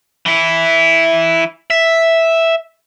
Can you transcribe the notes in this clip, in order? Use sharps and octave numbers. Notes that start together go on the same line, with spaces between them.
E3 E4
E5